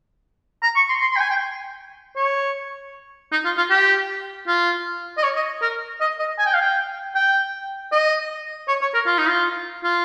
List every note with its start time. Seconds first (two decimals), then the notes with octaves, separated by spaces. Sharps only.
0.62 A#5
0.76 C#6
0.89 C6
1.01 C6
1.11 C6
1.16 G5
1.20 G#5
1.30 G5
2.16 C#5
3.32 D#4
3.45 F4
3.57 F4
3.70 G4
4.47 F4
5.18 D#5
5.23 C#5
5.36 D#5
5.62 A#4
6.00 D#5
6.19 D#5
6.39 G#5
6.46 G5
6.54 F5
6.61 G5
7.15 G5
7.92 D#5
8.68 C#5
8.81 C#5
8.94 A#4
9.06 F4
9.18 D#4
9.28 F4
9.84 F4